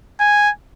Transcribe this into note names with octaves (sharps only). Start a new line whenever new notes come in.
G#5